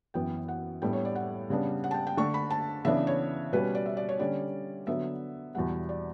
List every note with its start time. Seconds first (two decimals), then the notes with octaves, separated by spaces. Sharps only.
0.14 F#2 E3 B3 G5
0.48 F#5
0.82 A2 G3 B3 D4 G5
0.93 C#5
1.05 D5
1.15 F#5
1.50 C#3 G3 B3 D4
1.84 F#5
1.91 A5
1.94 G5
2.07 G5
2.17 D3 A3 D4 C#6
2.34 B5
2.50 A5
2.85 C#3 E3 B3 D4 E5
3.07 C#5
3.52 B2 G3 C#4 B4
3.75 D5
3.86 E5
3.97 D5
4.09 C#5
4.19 D3 G3 C#4 D5
4.87 D3 F#3 B3 E5
5.55 E2 B2 G3 F#5
5.89 D5